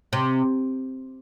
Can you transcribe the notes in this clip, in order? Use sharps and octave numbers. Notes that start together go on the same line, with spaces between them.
C3